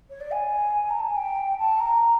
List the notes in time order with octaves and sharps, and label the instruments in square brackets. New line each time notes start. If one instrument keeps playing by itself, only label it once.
[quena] C#5
D5
G#5
A#5
A5
G#5
G5
A5
A#5